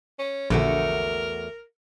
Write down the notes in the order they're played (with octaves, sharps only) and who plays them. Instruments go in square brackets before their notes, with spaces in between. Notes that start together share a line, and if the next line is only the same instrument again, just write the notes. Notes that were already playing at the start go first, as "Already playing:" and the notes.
[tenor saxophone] C#4
[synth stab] A#1 D3 [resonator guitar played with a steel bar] E2 A3 F#4 [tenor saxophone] A#4